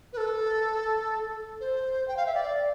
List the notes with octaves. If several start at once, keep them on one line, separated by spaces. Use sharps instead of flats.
B4
A4
C5
G5
F5
E5
D5